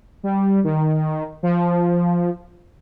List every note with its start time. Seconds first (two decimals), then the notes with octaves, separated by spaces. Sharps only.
0.23 G3
0.64 D#3
1.43 F3